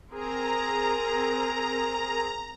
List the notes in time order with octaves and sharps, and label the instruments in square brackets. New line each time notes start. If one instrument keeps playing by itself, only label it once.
[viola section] C4 G#4 A#4 [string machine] A#5